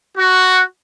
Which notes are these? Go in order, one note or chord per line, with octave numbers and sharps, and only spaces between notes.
F#4